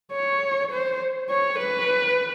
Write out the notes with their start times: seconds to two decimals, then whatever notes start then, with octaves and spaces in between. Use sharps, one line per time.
0.12 C#5
0.71 C5
1.29 C#5
1.59 B4